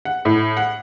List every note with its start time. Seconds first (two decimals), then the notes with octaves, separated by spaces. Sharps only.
0.05 F#5
0.25 A2
0.57 F#5